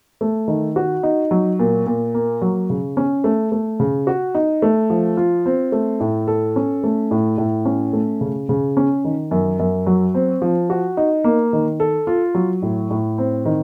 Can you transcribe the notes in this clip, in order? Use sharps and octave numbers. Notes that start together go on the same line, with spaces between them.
A3
D#3
F#4
D#4
F#3
A#2
A#2
A#3
F#3
C#3
C#4
A3
A3
C#3
F#4
D#4
A3
F3
F4
C4
A3
A2
A4
C#4
A3
A2
A2
C#4
A3
C#3
C#3
C#4
D#3
F#2
F#2
F#3
C4
F3
F#4
D#4
A#3
D#3
A4
F4
F#3
A2
A2
C4
D#3